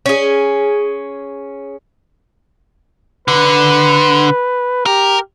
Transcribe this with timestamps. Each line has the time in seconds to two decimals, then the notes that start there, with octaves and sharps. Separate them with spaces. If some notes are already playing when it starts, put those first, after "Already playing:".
0.06 C#4 G#4
3.28 D3 B4
4.86 G4 A#4